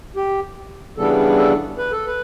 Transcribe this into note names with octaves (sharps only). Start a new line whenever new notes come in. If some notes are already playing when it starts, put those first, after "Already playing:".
G4
C#3 E3 G3 B3 D4 A4
A4
B4
A4
B4